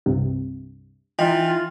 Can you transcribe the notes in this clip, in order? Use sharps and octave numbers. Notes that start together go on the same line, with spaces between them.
C2 G2 C3
E3 D#4 F4 G5